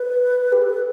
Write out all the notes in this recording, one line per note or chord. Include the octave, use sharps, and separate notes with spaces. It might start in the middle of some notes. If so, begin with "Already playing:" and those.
Already playing: B4
G4
A4
B4